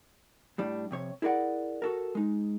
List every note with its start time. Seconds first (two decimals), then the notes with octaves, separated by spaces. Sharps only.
0.58 A2 G3 D4
0.91 F2 C3 C#5
1.22 E4 G#4 A#4 D5 F#5
1.82 F#4 A4 A#4
2.15 G#3 D#4